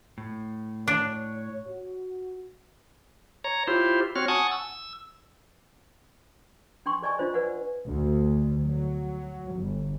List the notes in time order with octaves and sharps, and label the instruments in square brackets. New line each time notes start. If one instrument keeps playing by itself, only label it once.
[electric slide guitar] A2
[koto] D4 [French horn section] C#5
[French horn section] F#4
[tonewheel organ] C#5 A#5
E4 F4 G4 C5
C4 F#4 C#5 F6
F#5 G#5 A5 C#6 D#6
E6
[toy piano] D4 G5 C6 C#6
G#4 D5 D#5 G#5 C#6
D4 F4 C5 D#5
B4 D5 F#5 G#5
[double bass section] D2
F#3
G1